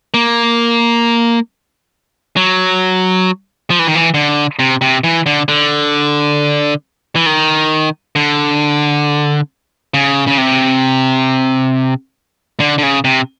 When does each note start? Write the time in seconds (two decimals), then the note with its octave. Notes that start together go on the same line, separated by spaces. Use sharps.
0.14 A#3
2.36 F#3
3.70 F3
3.79 E3
3.87 D#3
3.95 E3
4.14 D3
4.59 C3
4.81 C3
5.04 E3
5.26 D3
5.48 D3
7.16 E3
7.26 D#3
8.16 D3
9.94 C#3
10.27 C#3
10.38 C3
12.60 D3
12.78 D3
12.83 C#3
13.04 C3